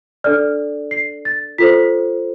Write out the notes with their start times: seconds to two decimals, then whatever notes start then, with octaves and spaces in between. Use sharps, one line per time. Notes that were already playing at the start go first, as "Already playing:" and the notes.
0.24 D4 A4 D5 F6
0.91 C7
1.25 A6
1.58 F4 A4 C5 B6